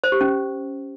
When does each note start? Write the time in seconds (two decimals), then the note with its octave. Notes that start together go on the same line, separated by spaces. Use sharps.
0.04 C5
0.12 G4
0.21 C#4